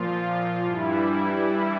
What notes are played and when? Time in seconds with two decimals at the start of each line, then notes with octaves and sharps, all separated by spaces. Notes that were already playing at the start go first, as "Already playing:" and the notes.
Already playing: A#2 F3 F4
0.65 G2 E3 G3 E4
1.32 E4